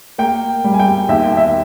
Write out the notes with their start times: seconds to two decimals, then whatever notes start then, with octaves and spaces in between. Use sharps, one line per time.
0.18 A#3 G5
0.64 G3
0.74 G#5
0.79 G5
1.09 D#2 E5
1.24 G5
1.37 E5